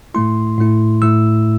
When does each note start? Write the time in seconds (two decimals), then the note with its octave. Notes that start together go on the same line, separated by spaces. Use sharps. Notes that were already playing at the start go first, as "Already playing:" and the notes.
0.14 A2 A3 E4 C6
0.58 A2 A3 E4
1.02 A2 A3 E4 E6